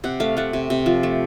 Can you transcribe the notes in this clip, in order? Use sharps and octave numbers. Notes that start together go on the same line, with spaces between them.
C3 F#5
A3 F5
A3 F#5
C3
C3
F3
A3